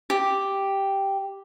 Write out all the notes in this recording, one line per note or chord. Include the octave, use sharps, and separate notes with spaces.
G4